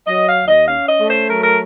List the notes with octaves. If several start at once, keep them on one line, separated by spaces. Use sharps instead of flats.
F#3 D#5
F5
D#2
D#5
C#4 F5
D#5
A3
C5
F#3 A#4
A#4